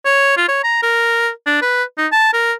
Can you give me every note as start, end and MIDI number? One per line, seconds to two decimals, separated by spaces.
0.05 0.36 73
0.37 0.48 65
0.49 0.61 73
0.64 0.78 82
0.82 1.29 70
1.46 1.61 62
1.62 1.83 71
1.98 2.07 63
2.12 2.32 81
2.34 2.53 70